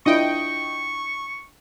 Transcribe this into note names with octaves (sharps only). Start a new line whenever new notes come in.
D4 E4 F4 D#5 G5 C#6